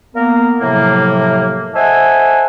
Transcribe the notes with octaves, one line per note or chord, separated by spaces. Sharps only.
A#3 B3 A#4
A2 C3 F3 F#3 A#3
A4 C5 D#5 E5 F#5 G#5